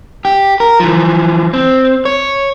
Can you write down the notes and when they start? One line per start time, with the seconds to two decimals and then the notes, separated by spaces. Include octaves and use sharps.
0.25 G4
0.60 A#4
0.80 E3 F3
1.53 C4
2.05 C#5